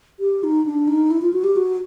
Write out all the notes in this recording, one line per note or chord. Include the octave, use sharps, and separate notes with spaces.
G4
D#4
D4
D#4
E4
F4
F#4
G4
F#4